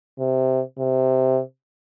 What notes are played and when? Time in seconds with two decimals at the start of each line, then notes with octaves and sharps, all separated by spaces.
0.19 C3
0.78 C3